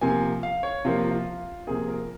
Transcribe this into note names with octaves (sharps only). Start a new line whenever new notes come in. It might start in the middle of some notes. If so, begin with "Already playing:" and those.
C3 F3 A#3 G#5
F5
C#5
C3 F3 A#3 F4
F4
C3 F3 A#3 G#4
A#4